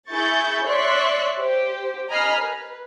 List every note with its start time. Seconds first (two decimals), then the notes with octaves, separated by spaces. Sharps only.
0.10 E4 G#4 C#6 G6 A6
0.66 C#5 D5 E5 C6 C#6 F#6
1.38 G4 C5
2.09 D#5 G#5 A#5 B5 F6 C7
2.40 B4